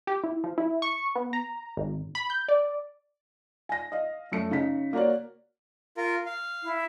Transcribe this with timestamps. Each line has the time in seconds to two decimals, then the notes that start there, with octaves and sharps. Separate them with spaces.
0.07 G4
0.24 E4
0.44 F3
0.58 E4
0.82 C#6
1.15 B3
1.33 A#5
1.77 G#1
2.15 B5
2.30 G6
2.48 D5
3.69 G#5 A#6
3.92 D#5 F5
4.32 F#2 A3 C#7
4.51 C#3 D#4 B6
4.93 A#3 F#4 A#4 C#5 D5
5.97 F4 A#4
6.26 F5
6.63 E4